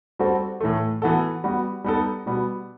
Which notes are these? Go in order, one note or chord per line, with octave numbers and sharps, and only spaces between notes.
G3 C4 F#4 A4
A2 E3 A3
E3 B3 F#4 A4
G3 B3 F#4
G3 B3 D#4 A4
B2 G3 B3